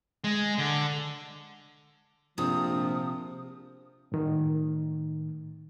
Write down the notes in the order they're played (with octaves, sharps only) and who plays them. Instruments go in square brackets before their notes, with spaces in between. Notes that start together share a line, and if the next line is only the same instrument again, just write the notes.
[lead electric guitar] G#3
D3
[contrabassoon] A#1 [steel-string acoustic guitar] C3 [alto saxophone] F3 [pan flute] D#6
[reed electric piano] A2 D#3